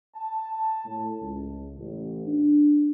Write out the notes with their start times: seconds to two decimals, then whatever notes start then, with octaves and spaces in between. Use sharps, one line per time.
0.15 A5
0.86 A2
1.21 C#2
1.76 A1
2.26 D4